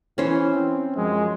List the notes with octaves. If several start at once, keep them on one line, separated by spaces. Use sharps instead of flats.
E3 C#4 E4 C5
C4
F#2 F3 G#3